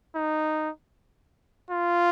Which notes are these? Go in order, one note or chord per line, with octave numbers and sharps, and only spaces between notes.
D#4
F4